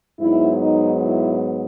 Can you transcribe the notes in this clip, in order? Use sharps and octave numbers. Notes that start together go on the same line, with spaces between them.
G#2 F#3 B3 D#4 E4
D#4
E4